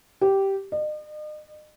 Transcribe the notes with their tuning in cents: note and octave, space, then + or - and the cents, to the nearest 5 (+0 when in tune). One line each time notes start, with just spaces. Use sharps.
G4 -10
D#5 -40